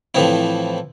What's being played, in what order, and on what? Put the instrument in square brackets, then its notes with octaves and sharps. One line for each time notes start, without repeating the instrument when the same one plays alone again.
[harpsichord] A2 E3 F3 C4 E4